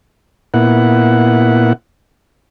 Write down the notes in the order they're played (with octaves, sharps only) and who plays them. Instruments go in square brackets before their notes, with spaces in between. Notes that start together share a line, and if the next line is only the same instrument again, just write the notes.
[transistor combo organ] A#2 B3 E4 F#5